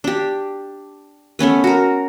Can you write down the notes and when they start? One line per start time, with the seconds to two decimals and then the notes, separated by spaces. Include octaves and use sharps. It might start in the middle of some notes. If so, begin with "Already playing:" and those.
0.04 D4 G4
1.39 A3 B3 C#4 B4
1.64 F#4 A#4